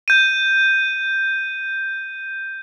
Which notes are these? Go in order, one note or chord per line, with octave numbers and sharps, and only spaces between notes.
G6 D#7